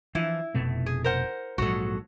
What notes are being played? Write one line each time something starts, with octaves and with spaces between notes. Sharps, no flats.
E3 F3 E4
F1 B2 A3
G#4
A#4 C5 F#5
A#1 G#2 F#3 F#4 A4